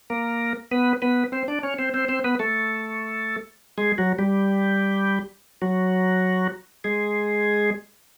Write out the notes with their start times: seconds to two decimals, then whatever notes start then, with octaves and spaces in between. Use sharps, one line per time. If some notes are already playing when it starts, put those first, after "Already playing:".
0.10 A#3 A#4
0.71 B3 B4
1.02 B3 B4
1.32 C4 C5
1.48 D4 D5
1.63 C#4 C#5
1.78 C4 C5
1.94 C4 C5
2.09 C4 C5
2.24 B3 B4
2.39 A3 A4
3.78 G#3 G#4
3.98 F#3 F#4
4.18 G3 G4
5.62 F#3 F#4
6.84 G#3 G#4